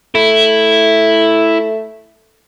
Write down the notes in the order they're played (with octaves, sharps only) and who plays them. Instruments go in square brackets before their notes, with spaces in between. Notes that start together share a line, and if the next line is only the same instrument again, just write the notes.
[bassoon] A3 [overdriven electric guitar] E4